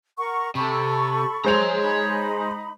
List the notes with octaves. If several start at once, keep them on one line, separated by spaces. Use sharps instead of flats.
A#4 F#5 C#6
C3 A4 B5 C#6
G#3 C5 C#5 A#5 F7
D#4 B5